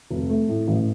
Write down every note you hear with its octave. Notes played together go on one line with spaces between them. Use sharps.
F1
A3
A2
A1